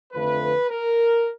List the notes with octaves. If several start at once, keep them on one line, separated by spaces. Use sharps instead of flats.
F2 D3 F3 A3 B4
A#4